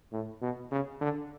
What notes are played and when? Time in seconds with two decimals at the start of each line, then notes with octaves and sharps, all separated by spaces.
0.12 A2
0.42 B2
0.71 C#3
1.01 D3